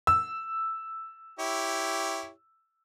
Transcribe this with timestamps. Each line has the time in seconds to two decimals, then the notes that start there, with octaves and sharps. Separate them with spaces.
0.07 E6
1.39 E4 G4 C#5